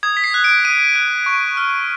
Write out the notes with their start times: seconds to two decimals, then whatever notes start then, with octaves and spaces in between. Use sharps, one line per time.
0.03 D#6 G#6
0.17 B6
0.24 C7
0.34 F#6
0.44 D7
0.65 D#6 D#7
0.96 F#6
1.26 C#6
1.57 F6